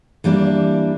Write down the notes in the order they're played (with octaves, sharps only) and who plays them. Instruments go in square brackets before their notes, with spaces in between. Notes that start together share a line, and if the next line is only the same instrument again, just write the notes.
[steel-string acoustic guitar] E3 G3 A#3 D4